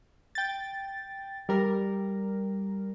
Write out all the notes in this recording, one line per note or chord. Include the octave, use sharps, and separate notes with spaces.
G5 A6
G3 A#4